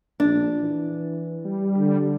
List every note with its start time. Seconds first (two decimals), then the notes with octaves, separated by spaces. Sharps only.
0.20 A#1 D4
0.60 E3
1.45 G3
1.78 D3